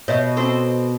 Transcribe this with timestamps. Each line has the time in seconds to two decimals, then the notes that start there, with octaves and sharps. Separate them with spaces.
0.08 B2 C#5 D#5 E5
0.37 C4 A4 C5